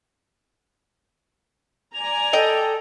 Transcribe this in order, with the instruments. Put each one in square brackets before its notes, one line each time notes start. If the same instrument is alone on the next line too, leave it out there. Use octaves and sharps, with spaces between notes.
[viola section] D5 G#5 A#5 [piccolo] F7
[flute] A4 [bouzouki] D#5 G5